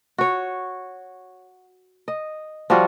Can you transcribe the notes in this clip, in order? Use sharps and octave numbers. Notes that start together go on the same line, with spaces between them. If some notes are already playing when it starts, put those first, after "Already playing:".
F#4 C#5
D#5
F3 G3 F4 F#4